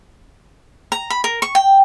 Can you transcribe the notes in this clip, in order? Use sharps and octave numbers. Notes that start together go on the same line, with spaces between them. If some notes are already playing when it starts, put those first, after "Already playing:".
A#5
B5
A#4
C#6
G5